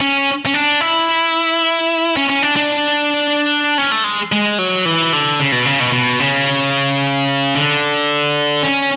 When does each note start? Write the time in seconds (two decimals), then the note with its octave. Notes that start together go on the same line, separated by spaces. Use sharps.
0.01 C#4
0.46 C#4
0.54 D4
0.81 E4
2.16 C#4
2.30 C#4
2.42 D4
2.56 D4
3.78 C#4
3.92 A3
4.04 G#3
4.32 G#3
4.59 F#3
4.85 E3
5.13 D3
5.40 C#3
5.52 B2
5.66 C#3
5.80 B2
5.92 B2
6.20 C#3
7.55 D3
8.63 C#4